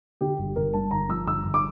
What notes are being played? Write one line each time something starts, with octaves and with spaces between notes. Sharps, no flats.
D3 G4
G1
G1 A#4
G2 A5
G1 A#5
F3 E6
G1 E6
G1
D6